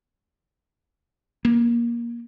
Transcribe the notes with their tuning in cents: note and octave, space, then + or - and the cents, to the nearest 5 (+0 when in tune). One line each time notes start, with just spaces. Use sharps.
A#3 +20